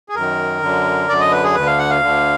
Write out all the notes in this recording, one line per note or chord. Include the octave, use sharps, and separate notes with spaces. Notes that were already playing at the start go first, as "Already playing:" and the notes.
G#4
F#2 D#3 A#4
F#2 D3
F#2 D3 D5
D#5
B4
G#4
D2 D3 B4
F5
F#5
F5
D2 D3